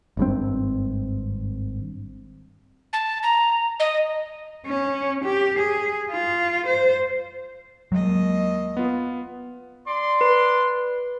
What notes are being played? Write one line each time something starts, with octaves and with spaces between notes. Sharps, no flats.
G#1 G2 C4
A5
A#5
D#5
C#4
G4
G#4
F4
C5
D#2 F#3 G#3 D#5
B3 F4
D5 C6
B4